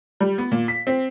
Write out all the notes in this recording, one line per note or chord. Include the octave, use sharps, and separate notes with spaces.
G3
B3
A#2
B6
C4